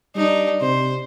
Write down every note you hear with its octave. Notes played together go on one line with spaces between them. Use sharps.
G3 D4 D#4
C3 C5